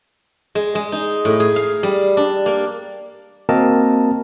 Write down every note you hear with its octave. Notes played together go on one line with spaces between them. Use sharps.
G#3
G#3
D#4
A2
G#4
F5
G3
D4
A#3
A#3 C4 F#4 A#4 D#5 A5